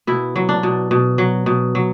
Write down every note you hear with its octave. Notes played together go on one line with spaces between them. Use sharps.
B2 E4
F#3
D4
B2
B2
F#3
B2
F#3